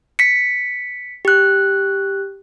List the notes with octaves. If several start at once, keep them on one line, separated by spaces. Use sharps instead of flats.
B6 C#7
G4 F#6